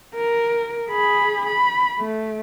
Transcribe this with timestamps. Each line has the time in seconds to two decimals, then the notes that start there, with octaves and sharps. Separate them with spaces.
0.15 A#4
0.88 G#4 B5
1.46 B5
1.98 A3